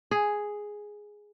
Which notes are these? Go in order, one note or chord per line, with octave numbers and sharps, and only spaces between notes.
G#4